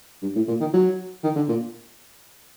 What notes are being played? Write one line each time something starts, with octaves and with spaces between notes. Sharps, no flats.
G2
A2
A#2
D#3
F#3
D#3
D3
A#2